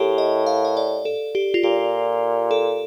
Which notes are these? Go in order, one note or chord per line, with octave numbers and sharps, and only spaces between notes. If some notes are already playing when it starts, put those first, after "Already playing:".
Already playing: A2 G4 A4 A#4
D#5
F5
D#5
D5
A4
G4
F4
A#2 G4
A4